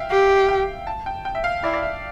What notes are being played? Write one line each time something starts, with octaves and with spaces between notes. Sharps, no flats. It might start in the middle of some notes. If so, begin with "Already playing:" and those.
Already playing: E5 F5 G5
G4 F5
G5
A5
G5
G5
E5
F5
E4 D5
D5
E5